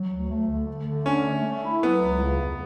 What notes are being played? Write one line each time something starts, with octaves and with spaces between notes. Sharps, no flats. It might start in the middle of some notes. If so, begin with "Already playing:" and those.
Already playing: F#3
D2
A3
D3
A3
D3
C#4 D4
A3
A3
E4
F#3 B3
C#2
C#3
E2